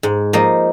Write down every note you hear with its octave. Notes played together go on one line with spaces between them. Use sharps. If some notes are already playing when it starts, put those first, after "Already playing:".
G#2
F3 A#3 D#4